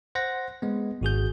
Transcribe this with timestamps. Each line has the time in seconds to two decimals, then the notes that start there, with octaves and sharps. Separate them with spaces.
0.15 C5 F#5 A#6
0.62 G#3 B3
1.01 G#1 F#4 G#4 G6